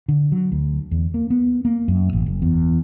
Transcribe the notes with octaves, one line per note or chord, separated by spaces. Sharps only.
D3
F#3
D2
E2
A#3
B3
A#3
F#2
A1
F#1
E2